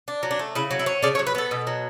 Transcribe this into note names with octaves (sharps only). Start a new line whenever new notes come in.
D4
F#3
D4
A3
C#3 E4
F#3
E4
C#4
C#3 D4
C#5
F#3
B4
B3 A4
B2
F#3